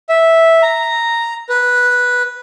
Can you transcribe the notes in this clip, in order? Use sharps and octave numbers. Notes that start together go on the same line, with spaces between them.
E5
A#5
B4